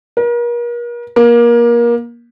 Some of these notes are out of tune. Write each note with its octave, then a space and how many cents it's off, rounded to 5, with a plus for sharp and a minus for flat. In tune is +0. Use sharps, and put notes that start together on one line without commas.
A#4 +40
A#3 +25